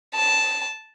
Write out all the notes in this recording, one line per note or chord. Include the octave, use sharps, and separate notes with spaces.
A5